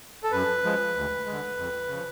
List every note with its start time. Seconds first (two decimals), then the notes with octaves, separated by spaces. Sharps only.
0.23 A4
0.32 F#2 B4
0.63 F3 G#3
0.95 D2
1.26 D3 G#3
1.58 F2
1.89 C#3 F3